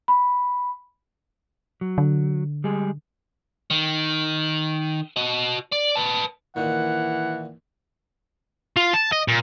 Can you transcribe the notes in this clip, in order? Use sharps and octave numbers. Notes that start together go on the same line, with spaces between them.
B5
F#3
D3
G3 G#3 G#4
D#3
F#4 D#5
D5
B4 A5
A#2 D#3 E3 F#5
F4
A5
D#5
A#2